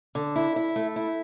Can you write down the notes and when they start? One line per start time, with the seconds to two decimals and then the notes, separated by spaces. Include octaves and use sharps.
0.15 D3
0.36 E4
0.56 E4
0.76 A3
0.96 E4